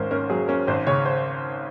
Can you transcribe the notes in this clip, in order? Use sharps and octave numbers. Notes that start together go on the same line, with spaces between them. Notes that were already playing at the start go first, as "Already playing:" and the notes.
Already playing: G#1 G#2 C#4 A#4 C5
C#4 A#4
F#3 G#4
C#4 A#4
G#1 C5
C#3 C#5
C5